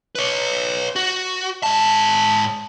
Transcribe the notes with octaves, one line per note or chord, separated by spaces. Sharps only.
B4 C#5
F#4
G#2 A5